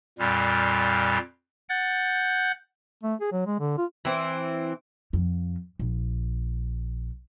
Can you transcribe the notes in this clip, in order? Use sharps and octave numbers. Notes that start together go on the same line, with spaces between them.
F2 A#2 G3
F#5 F#6 G6 A6
A3
G#4
F#3
G#3
D3
F4
E3 C4
F2
A#1